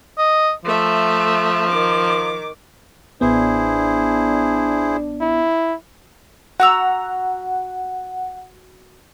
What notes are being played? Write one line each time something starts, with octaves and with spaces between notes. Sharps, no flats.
D#5
F3 A3 E5
D#3 D6
A1 B3 D4 E4 G#4 C5
E4
F#4 F#5 A#5 E6